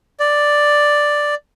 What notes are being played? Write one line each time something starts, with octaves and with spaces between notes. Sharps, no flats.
D5